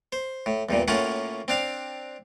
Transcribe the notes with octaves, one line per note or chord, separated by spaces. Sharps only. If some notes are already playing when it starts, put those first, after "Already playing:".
C5
A2
E2 G2 A#2
A2 A#3 C#4 F4 F#5
C4 D4 F5